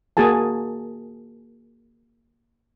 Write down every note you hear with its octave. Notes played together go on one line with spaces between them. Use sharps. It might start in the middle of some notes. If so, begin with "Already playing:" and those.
A#3 F#4 G#4 G#5 A5